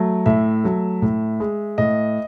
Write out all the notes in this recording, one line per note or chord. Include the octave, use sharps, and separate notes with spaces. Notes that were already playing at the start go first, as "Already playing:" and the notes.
Already playing: F#3 A3
A2 E5
F#3 A3
A2
G#3
A2 D#5